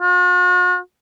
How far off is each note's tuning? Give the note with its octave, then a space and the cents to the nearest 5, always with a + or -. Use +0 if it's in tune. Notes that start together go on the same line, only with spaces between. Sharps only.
F#4 -45